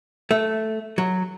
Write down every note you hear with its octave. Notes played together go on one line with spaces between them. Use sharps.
A3
F#3